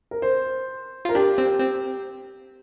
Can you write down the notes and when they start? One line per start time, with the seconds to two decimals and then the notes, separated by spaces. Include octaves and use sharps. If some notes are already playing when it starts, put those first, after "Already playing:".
0.11 A#4
0.22 C5
1.05 F4 A#4
1.15 D4 G4
1.38 C4
1.60 C4